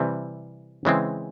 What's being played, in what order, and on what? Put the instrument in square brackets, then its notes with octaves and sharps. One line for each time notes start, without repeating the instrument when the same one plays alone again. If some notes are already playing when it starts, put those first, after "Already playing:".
Already playing: [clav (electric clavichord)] C3 E3 G3 C4
C#3 E3 G#3 C4